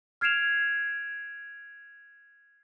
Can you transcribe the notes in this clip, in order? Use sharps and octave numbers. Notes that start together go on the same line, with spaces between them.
F6 G#6 C7 D7 E7 F7